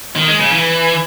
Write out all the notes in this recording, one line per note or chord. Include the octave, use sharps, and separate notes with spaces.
D#3
G#3
C#3
E3